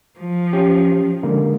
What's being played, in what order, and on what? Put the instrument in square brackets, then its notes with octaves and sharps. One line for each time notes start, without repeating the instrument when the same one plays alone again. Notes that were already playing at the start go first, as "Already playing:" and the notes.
[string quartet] F3
[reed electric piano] C#4 G4
D3 G#3 A#3